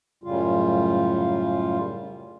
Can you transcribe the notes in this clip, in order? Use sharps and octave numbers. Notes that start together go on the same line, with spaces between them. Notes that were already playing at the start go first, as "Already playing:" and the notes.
F#2 A2 C#3 G3 F4